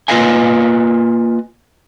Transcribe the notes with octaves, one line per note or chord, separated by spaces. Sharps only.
A#3 F4 B4 D#5 F5 G#5